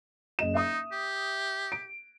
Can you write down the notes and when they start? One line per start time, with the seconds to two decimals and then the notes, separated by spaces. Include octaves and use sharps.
0.39 F#1 D#5 E7
0.55 D#4 E5 D#6
0.92 G4
1.72 D7